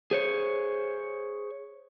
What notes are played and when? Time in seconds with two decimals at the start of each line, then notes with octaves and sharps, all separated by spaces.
0.11 G#4 C5 C#5